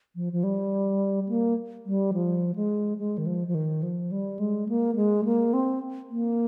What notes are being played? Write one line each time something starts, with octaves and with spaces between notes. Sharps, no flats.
F3
F3
G3
A#3
G3
F3
G#3
G#3
D#3
F3
F3
D#3
F3
G3
G#3
A#3
G#3
A#3
C4
A#3